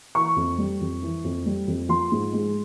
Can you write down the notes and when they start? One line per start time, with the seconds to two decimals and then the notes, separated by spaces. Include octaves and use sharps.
0.15 E3 C#6
0.36 F2
0.58 G3
0.81 F2
1.02 E3
1.24 F2
1.46 G3
1.68 F2
1.89 F3 C6
2.12 G#2
2.33 G#3